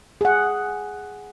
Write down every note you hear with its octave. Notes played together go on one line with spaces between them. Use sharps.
G#4 F#5